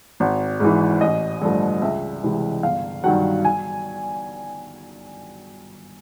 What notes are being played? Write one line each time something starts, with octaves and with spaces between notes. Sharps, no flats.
G#1
G#2 E3
A1 D#5
G2 D3 F3 A3
C#2 E5
C3 E3 G#3
G1 F5
G2 D#3 F#3 F#5
G#5